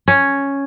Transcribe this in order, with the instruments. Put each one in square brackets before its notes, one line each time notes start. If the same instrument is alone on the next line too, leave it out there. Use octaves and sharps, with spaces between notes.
[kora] C#4